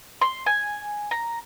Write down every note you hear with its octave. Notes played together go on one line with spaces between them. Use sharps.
C6
G#5
A#5